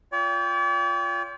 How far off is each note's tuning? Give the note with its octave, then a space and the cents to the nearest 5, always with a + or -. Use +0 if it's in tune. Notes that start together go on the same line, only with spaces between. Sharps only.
F4 +0 D5 -45 G5 +15